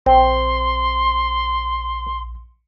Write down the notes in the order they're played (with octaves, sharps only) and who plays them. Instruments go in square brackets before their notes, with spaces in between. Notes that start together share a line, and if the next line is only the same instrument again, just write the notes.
[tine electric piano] A#1 [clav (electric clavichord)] C4 [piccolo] C6